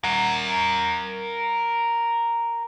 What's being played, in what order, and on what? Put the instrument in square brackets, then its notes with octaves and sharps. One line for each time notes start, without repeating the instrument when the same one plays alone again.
[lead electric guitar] A#4 F#5